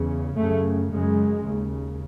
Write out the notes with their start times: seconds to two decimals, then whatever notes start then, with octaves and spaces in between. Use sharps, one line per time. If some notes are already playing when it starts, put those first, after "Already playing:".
Already playing: E2 C#3
0.37 F#2 C#3 A3
0.90 F#2 C#3 G#3
1.43 D#2 C#3